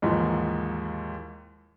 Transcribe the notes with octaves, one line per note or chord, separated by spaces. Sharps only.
D#2 G#2 E3 F3